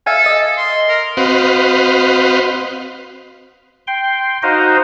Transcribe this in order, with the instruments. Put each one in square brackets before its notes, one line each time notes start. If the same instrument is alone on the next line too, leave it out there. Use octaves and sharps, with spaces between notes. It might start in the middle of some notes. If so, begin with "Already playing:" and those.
[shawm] A4 [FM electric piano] E5 F5 G#5
[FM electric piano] D#5
[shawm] C6
A#4
[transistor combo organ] C4 F#4 B4 C5 D#5 F5
[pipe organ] G5 C6
D#4 F#4 C5 D#5 F5